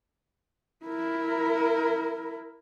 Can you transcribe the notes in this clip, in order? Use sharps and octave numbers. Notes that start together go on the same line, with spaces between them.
E4 A#4